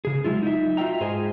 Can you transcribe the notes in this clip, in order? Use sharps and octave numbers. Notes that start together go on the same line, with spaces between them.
C#3 G#4
F#3 G#3 E4 F4
D#4 D#5 E5
F4 F#4 D#5 E5 G5 A#5
G#2 G#4 C5 D#5 G#5